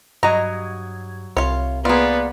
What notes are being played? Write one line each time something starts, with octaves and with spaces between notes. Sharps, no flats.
G2 F#3 D#5 A#5 G#6
C2 F4 C#5
A#3 B3 F4 G#4 D5